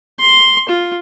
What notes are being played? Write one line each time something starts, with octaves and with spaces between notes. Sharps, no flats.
C6
F4